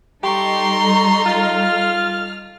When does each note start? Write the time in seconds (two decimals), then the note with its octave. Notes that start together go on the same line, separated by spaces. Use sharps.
0.23 G3 D#4 G4 A4 A#5 C6 C#6
1.26 F4 F6